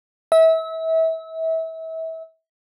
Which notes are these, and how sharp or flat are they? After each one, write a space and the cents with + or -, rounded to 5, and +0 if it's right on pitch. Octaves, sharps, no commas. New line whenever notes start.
E5 -30